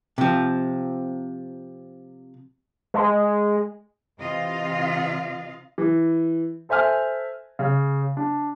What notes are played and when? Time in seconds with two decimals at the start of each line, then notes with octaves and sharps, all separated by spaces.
0.18 C3 F3
2.94 G#3
4.18 C3 E3 F4 D#5 F5
5.78 E3
6.69 A4 C5 E5 G#5 F6
7.59 C#3
8.17 D4